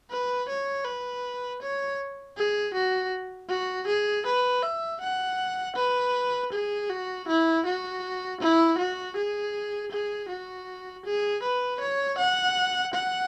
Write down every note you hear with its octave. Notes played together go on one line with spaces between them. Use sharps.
B4
C#5
B4
C#5
G#4
F#4
F#4
G#4
B4
E5
F#5
B4
G#4
F#4
E4
F#4
E4
F#4
G#4
G#4
F#4
G#4
B4
C#5
F#5
F#5